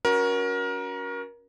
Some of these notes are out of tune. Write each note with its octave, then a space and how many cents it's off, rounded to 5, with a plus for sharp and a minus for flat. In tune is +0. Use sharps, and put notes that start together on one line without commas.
C#4 +25 F#4 +0 A#4 +25